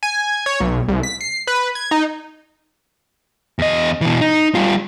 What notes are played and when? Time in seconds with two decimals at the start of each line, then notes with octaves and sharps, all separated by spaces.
0.03 G#5
0.46 C#5
0.60 B1
0.88 C2
1.03 B6
1.21 C7
1.47 B4
1.75 G#6
1.91 D#4
3.59 E2 D#5
4.01 B2 E3
4.21 D#4
4.55 G3 F4